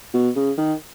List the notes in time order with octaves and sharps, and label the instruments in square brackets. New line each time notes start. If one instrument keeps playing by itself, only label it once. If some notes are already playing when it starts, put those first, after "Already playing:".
[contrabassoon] B2
C#3
D#3